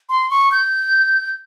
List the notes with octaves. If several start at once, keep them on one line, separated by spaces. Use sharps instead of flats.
C6
C#6
G6